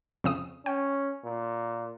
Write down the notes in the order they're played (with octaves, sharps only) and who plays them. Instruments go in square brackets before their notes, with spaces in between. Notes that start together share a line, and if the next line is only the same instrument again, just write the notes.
[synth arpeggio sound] F2 C#3 D#6
[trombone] C#4 [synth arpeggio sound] G5
[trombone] A#2